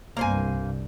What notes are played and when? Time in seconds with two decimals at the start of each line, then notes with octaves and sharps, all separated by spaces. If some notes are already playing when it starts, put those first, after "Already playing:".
0.17 C2 G2 A#3 C5 G#5